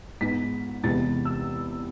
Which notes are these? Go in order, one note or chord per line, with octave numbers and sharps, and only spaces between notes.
G#2 G#3 B3 B6
E2 C3 G#3 B3 A6
E6